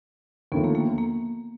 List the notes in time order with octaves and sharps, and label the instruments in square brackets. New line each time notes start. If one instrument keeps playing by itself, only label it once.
[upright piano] D#2 D3 F3 A3 [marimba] B3
[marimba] A#3
A#3
A#3